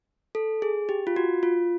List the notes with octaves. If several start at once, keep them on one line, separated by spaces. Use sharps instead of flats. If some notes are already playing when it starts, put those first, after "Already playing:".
A4
G#4
G4
F4
F#4
F4